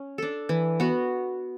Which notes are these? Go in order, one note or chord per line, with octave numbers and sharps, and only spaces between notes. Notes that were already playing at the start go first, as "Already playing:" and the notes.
Already playing: C#4
D4 A4
E3
B3 F#4